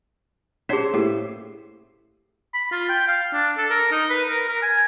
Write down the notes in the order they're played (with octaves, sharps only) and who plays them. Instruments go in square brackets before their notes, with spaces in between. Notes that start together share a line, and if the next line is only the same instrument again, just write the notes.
[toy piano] C#4 G#4 [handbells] D4 C#5 B6 [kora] C5 E5
[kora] A2 [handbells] A#3 G4 C7
[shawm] B5
F4
G5
F5
D4
A4
A#4
D#4
B4
A#4
A#4
G#5